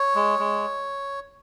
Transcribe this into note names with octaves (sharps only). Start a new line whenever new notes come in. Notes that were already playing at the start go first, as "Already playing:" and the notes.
Already playing: C#5
G#3
G#3